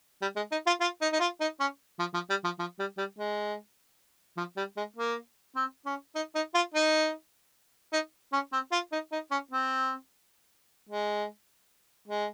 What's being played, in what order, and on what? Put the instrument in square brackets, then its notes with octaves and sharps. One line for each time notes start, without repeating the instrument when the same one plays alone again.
[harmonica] G3
G#3
D#4
F4
F4
D#4
D#4
F4
D#4
C#4
F3
F3
G3
F3
F3
G3
G3
G#3
F3
G3
G#3
A#3
C4
C#4
D#4
D#4
F4
D#4
D#4
C#4
C4
F4
D#4
D#4
C#4
C4
G#3
G#3